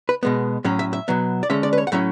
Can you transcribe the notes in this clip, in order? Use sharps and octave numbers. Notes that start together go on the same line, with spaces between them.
B4
B2 G#3 B3
A2 F#3 C#4 C#5
E5
E5
B2 F#3 B3
D5
D3 G#3 C#4 E5
D5
B4
C#5
F#5
A2 F#3 C#4 E5